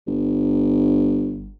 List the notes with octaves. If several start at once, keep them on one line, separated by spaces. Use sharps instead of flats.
G1